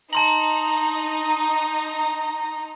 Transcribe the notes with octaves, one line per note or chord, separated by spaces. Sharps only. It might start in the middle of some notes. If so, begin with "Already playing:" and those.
D#4 A5 A#5 C6 F#7